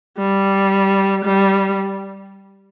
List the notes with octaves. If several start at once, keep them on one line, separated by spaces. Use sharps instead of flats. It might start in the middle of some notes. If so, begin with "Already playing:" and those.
G3
G3